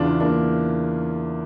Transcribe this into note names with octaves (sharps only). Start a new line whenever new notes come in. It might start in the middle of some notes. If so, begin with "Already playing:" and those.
Already playing: E2 C#3 E3 D4 F4
A#3 D4